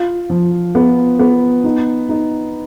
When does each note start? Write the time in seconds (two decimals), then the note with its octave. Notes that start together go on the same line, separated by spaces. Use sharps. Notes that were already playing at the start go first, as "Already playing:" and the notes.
Already playing: F4
0.30 F3
0.75 B3
1.19 B3
1.64 D#4
2.09 D#4